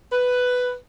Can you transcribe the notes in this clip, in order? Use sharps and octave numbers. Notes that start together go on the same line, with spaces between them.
B4